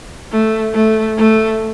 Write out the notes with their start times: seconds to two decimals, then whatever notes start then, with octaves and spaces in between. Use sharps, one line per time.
0.31 A3
0.74 A3
1.17 A3